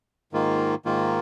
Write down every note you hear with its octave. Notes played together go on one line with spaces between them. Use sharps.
G#2 D#3 A#3 F4
G#2 D#3 A#3 F4